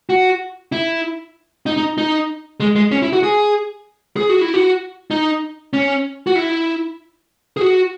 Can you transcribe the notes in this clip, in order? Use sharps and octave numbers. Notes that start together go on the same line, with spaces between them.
F#4
E4
D#4
D#4
D#4
G#3
G#3
C#4
E4
F#4
G#4
G#4
F#4
E4
F#4
D#4
C#4
F#4
E4
G#4
F#4